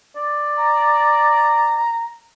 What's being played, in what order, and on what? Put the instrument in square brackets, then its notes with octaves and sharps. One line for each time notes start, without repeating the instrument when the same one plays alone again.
[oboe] D5
[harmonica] A#5